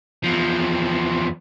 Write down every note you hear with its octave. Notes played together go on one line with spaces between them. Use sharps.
E2 F3